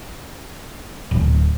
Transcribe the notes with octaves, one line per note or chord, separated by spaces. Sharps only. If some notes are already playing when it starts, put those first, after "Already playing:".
D1